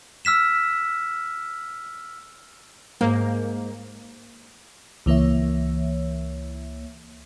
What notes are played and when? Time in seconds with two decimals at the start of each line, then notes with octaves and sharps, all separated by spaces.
0.25 E6 F6 B6 E7
3.01 G#2 A#3
5.06 C#2 E3 A#3 C#5 E5